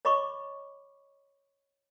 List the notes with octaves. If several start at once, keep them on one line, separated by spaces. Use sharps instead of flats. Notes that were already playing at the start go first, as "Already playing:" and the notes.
C#5 D#5 B5 C#6 D6